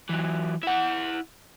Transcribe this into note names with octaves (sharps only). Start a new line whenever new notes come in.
E3 F#3
E4 F#5